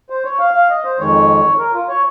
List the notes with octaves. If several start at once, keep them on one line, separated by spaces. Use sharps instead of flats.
C5
C#5
F5
F5
D#5
C5
F2 D#3 G#3 C#5
A#4
F4
C#5